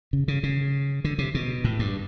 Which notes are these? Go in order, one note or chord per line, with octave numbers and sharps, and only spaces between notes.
C#3
C#3
C#3
D3
C3
B2
A2
G2